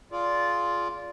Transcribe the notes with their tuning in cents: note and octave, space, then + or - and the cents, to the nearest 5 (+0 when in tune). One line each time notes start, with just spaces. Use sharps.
F4 +0 G#4 +25 D5 -15